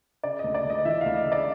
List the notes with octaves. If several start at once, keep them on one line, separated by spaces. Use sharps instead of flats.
C#3 D5
D#5
D2
D5
D2
D#5
E3 E5
F5
D2
D#5
C#3
D5